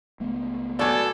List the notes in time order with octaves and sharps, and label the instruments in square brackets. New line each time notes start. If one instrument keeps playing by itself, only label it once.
[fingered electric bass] C#2 A3 B3
[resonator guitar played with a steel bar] B2 F#3 [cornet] A4 [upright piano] D5 G#5 G#6